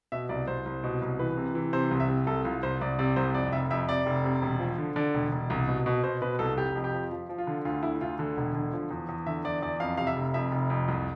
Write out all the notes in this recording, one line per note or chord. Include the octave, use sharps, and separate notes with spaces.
B2 E5
C2 D5
C2 C5
C2
B2
C2
E3 B4
C3
E3
C3 C5
C2
E5
C3
C2 A4
C2 F4
C2 C5
C2 D5
C3 D5
C2 C5
F2 D5
F1 E5
F2 E5
C3 D5
F1
C3
E1
F3
D3
D3 D5
E1
E1
C2
B2
B2
B2 C5
B2 B4
C2 A4
F1 G4
F2
G4
F3
F3
F3
F4
D3
D2 F4
D3 E4
D2 F4
D3
E1
D3
F3
E2
E2
D3 E5
E2 D5
E2 D5
F2 F5
C3 F5
E5
F1
F2 E5
F1
F2
C2